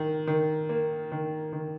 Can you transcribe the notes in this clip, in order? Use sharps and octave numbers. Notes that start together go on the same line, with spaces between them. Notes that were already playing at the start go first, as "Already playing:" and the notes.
Already playing: D#3
D#3
A#3
D#3
D#3